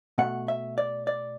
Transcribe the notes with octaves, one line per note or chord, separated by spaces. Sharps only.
B2 A3 F#5
E5
D5
D5